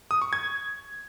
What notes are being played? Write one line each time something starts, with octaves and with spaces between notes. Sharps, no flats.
D#6
C#6
G#6